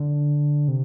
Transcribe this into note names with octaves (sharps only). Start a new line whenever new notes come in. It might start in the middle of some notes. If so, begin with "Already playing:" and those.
Already playing: D3
C3